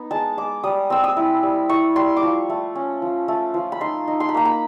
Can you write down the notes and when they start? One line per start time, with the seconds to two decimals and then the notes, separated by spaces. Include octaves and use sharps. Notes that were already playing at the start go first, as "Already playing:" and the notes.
Already playing: B3 D#4
0.11 G#3 A5
0.37 G#3 D6
0.64 G3 D#6
0.90 C4 E6
1.04 D#6
1.17 E4
1.43 G3
1.69 E4 C#6
1.96 G3 C6
2.17 D6
2.23 F3 C#6
2.49 A3
2.75 C#4
3.02 F3
3.28 A3
3.54 F3
3.72 B5
3.80 D#4 C6
4.08 D#4
4.20 C6
4.29 B5
4.34 A#3 A#5
4.45 B5